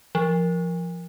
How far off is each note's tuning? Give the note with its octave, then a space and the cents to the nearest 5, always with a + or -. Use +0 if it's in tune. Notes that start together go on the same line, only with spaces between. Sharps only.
F3 -20